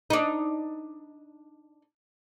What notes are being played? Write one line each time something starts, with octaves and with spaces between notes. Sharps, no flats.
D4 D#4